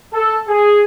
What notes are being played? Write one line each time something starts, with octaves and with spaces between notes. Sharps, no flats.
A4
G#4